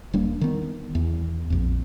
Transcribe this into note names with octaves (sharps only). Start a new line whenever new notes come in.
D#1 G3 A#3 D4
D#3 B3
E2
A#1 F2